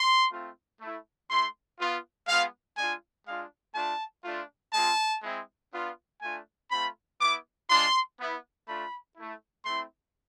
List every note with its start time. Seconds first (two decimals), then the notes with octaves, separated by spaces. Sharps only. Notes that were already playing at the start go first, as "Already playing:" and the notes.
Already playing: C6
0.32 A3 C4 F4
0.80 A3 E4
1.30 A3 E4 C6
1.79 B3 F4
2.28 G#3 B3 F4 F5
2.78 G#3 D4 F4 G#5
3.27 G#3 D4 F4 F5
3.75 A3 D4 F4 A5
4.24 A3 D4 F4
4.74 G#3 C4 F4 A5
5.23 G#3 C4 E4
5.73 B3 D4 F4
6.21 A3 D4 F4 G#5
6.71 A3 C4 F4 B5
7.20 B3 E4 D6
7.69 G#3 D4 F4 C6
8.19 B3 E4
8.68 A3 D4 F4 B5
9.16 A3 E4
9.65 A3 C4 E4 C6